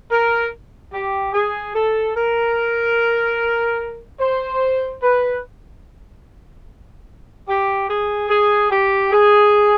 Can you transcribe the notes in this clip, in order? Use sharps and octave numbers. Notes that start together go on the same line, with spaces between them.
A#4
G4
G#4
A4
A#4
C5
B4
G4
G#4
G#4
G4
G#4